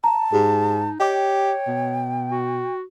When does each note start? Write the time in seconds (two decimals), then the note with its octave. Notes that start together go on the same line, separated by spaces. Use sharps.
0.04 A5 A#5
0.32 G#2 D#4 G4 G#4
1.00 G4 C#5 D#5 G5 D6
1.67 B2
2.30 F#4